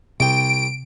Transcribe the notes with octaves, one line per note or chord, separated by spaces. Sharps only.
C2 C3 C4 G5 D7